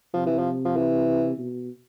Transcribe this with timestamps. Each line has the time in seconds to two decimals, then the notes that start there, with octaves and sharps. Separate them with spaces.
0.14 C3 F3
0.27 E3
0.39 F3
0.65 F3
0.76 E3
1.38 B2